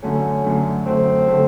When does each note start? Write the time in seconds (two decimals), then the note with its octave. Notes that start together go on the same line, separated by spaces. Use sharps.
0.03 F#2 D3 F#3 A3 C#4
0.44 F#2 D3 F#3 A3
0.86 F#2 D3 F#3 A3 C4
1.28 D3 F#3 A3